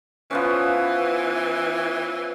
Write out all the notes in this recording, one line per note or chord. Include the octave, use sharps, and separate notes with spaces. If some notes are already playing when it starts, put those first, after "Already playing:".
E3 F3 B3 C#4